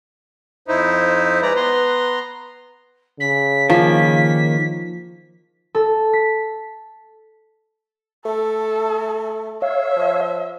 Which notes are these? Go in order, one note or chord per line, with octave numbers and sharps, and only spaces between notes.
F2 D#4 E4 C5
G#3 B4 D5 A#5
B3 A#5 C6
C#3 B6
D#3 F3 A#3 B6
A4
B6
A3 A4
C#5 E5 F5
F3